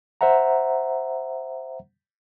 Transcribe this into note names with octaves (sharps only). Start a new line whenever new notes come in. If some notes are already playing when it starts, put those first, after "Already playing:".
C5 E5 F#5 A#5